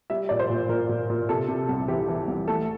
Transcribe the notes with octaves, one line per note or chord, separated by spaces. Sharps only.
G3 E5
A#2 D5
C5
A#2
A#2 A#4
A#2
A#2
C3 A4
C3
C2
E3 G4
E3
C2
A3 A4